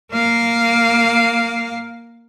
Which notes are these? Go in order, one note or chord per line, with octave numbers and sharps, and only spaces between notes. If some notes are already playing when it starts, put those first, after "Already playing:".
A#3 F5